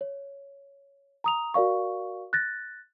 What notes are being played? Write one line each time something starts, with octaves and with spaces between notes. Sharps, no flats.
C#5
A#5 D#6 F7
F#4 A#4 D5 F5 C#6
F#6 A6 A#6